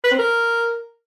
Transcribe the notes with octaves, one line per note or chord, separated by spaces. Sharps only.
B4
C4
A#4